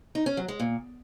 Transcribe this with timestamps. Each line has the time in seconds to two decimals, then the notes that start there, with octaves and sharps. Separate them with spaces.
0.15 D#4
0.26 C#4
0.37 F#3
0.48 G#3
0.60 A#2